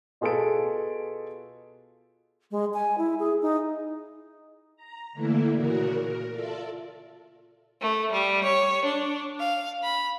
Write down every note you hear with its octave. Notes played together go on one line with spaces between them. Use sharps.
B2 F4 G#4 A4 B4 D7
G#3
G#5
E4
G#4
D#4
A#5
D3 E3 A3 A#3 E4
A#2 C#3 F#4 A#4
A#4
F4 A4 D5 E5
A3
G3
C#5
D4
F5
B5